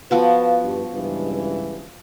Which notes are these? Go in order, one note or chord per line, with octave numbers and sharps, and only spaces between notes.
F3 B3 F#4 B4 F5 A5
G2
C#2 G2 E3